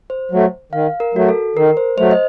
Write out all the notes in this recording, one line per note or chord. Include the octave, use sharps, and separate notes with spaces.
C5
F#3 A3
D#3 F5
A#4
F#3 A3 F#4
A4
D#3 A#4
C5
F#3 A3 C5
D#5